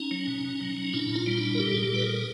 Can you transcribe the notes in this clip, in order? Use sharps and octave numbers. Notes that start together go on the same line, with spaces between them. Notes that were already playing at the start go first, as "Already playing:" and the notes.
Already playing: C#4 D#4
F#3
B2
B2
F#3
F#3
A#2 D4 E4
A#2
D#4 F4
G3 D#4
D4 E4
G3
A#4
A#2 G4 A4
A#2 G#4
G4 A4
G3 B4
G#4 A#4
G3